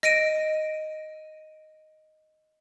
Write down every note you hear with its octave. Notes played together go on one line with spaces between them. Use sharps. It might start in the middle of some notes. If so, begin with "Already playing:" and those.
D#5 A#6 D7 D#7